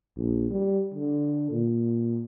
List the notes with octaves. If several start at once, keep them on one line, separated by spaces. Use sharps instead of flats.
A#1
G3
D3
A#2